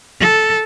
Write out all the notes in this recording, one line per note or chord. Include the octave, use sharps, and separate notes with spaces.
A4